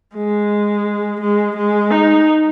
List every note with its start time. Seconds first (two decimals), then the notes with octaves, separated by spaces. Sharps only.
0.16 G#3
1.21 G#3
1.56 G#3
1.91 D#4